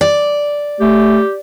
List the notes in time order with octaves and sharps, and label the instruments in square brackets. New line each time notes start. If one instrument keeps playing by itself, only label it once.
[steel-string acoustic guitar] D5
[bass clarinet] A3 [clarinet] G4